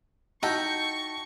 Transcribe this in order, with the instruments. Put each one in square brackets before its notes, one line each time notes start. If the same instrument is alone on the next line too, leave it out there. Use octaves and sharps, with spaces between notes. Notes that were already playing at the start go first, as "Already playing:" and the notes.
[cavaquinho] D#4 [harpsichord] E4 F#4 G5 [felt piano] A5 [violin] C#6